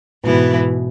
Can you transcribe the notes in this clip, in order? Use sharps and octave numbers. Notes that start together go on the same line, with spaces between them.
G#2 B2 E3 B3 E4 B4